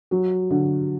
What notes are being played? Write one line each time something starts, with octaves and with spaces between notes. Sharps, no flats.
F#3
D3